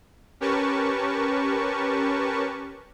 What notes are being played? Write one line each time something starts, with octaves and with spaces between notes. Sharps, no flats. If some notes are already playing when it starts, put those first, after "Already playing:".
C#4 G4 A#4 B4 A5 C#6